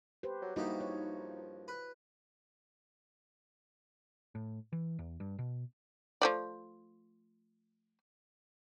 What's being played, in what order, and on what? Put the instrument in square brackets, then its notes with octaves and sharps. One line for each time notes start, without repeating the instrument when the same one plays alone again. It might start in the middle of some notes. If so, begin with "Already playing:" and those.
[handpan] G4 B4 C5
[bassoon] F#3
[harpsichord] G2 A#3 G4 [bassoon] F3 [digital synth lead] D#4 [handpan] E4 F#4 D#5
[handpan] C#5
[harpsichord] B4
[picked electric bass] A2
E3
E2
G2
B2
[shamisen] F3 A3 D5